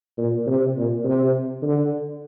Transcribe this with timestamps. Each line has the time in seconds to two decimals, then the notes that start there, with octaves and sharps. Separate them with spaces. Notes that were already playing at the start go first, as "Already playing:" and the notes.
0.18 A#2
0.47 C3
0.77 A#2
1.05 C3
1.62 D3